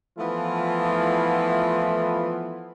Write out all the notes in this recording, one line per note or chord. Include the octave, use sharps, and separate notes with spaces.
E3 F3 A3 B3 E4 F4